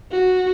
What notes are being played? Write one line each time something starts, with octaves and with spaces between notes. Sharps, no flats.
F#4